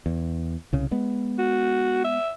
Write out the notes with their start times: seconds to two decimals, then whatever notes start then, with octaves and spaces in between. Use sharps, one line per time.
0.06 E2
0.73 C2 C#3
0.91 G#3 B3
1.39 F#4
2.05 E5